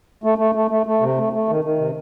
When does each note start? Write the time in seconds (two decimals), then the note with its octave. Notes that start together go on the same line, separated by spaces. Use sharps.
0.24 A3
0.38 A3
0.55 A3
0.71 A3
0.86 A3
1.01 C3
1.17 A3
1.33 A3
1.49 D#3
1.64 D#3
1.79 C3